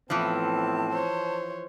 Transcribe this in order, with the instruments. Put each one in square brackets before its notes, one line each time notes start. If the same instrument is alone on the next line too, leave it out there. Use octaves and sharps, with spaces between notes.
[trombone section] A2 B3 C4 [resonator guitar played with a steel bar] E3 F3 [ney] A5
[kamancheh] C5 C#5